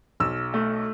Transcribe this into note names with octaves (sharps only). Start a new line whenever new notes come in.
B1 E6
A3